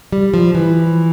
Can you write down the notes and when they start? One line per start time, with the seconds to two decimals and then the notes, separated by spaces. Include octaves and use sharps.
0.12 G3
0.34 F3
0.55 E3